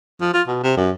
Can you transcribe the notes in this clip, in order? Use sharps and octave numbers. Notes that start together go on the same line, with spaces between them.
F3
F4
B2
C3
F#2